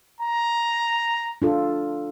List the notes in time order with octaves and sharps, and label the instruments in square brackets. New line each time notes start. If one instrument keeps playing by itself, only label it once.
[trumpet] A#5
[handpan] D4 F4 A4